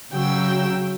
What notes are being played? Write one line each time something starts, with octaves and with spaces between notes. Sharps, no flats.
C#3 F#3 G5 E6